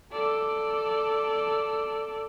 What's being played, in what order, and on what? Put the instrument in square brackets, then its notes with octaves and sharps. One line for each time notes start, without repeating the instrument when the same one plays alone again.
[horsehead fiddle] A4 D5